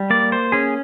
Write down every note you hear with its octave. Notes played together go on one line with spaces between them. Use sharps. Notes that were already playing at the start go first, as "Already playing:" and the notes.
Already playing: G3
A#3 D5
C5
C#4 G#4